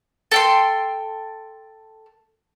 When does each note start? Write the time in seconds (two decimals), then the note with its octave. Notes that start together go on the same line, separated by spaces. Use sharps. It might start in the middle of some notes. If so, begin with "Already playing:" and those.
0.32 A4 G5 C6